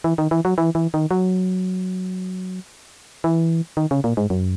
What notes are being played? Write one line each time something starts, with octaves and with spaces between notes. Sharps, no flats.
E3
D#3
E3
F#3
E3
E3
D#3
F#3
E3
D#3
C#3
A#2
G#2
F#2